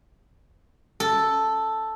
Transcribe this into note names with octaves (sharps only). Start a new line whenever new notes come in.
A4